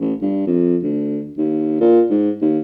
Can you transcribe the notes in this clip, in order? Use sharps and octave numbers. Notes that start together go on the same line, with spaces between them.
A1
G2
F2
D2
D#2
A#2
G#2
D#2